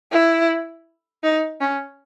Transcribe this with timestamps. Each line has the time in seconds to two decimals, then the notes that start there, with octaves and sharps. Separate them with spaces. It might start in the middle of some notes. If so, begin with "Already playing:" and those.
0.11 E4
1.23 D#4
1.60 C#4